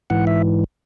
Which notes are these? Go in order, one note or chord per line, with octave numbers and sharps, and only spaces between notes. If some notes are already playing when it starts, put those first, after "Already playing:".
G#2 E3 F#5
E5